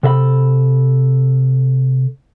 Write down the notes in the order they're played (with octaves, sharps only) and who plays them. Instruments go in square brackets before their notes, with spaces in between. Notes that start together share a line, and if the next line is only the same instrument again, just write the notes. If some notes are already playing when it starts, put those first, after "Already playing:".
[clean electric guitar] C3 A4 E5 B5